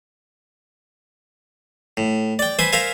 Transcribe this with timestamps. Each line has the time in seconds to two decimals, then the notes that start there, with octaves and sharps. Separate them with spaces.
1.97 A2
2.39 D5 G5
2.59 B4 C5 E5 G#5
2.72 A#4 C5 E5 F5 G#5